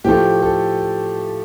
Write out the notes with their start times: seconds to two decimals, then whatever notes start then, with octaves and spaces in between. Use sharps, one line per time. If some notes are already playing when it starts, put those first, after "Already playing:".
0.04 A2 F3 A3 G4
0.42 A4